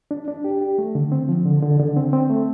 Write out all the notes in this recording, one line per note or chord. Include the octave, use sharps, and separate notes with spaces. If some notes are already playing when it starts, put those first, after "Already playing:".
D4
D4
G4
G4
A3
D3
C4
F3
D3
D3
D3
C4
C4
A3